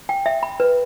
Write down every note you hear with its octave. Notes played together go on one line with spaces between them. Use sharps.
G5
E5
B5
B4